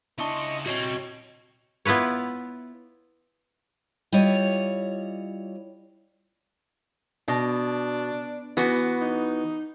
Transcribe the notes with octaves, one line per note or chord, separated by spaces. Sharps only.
C#3 D4 E4 D#5 C6 C#6 D#6
G3 C4 F#4 C#5 D#5
B3 E4 F4 B4 C#5
G3 E4 F4 C#5 D#5
B2 D4
E3 B3 F#4
D#4